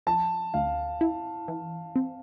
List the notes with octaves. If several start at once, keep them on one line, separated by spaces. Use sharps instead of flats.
F3 A5
D2 F5
E4
E3
C4